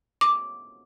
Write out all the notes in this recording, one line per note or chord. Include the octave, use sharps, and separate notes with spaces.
D6